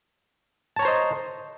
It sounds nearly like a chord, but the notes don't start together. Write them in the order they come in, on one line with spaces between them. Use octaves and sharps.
A5 C#5 A#5 C5 D#5